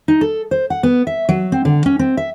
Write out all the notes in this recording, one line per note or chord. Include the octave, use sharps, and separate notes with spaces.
D#4
A4
C5
F#5
B3
E5
F#3
C4
D3
C#4
C4
E5